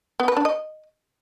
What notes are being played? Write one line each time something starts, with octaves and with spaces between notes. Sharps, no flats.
B3
B4
D4
D#5